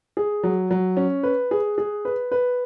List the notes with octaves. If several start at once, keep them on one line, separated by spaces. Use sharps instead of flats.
G#4
F#3
F#3
C#4
B4
G#4
G#4
B4
B4